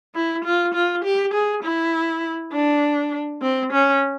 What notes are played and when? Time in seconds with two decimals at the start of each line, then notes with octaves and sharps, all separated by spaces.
0.15 E4
0.45 F4
0.74 F4
1.04 G4
1.33 G#4
1.63 E4
2.52 D4
3.42 C4
3.72 C#4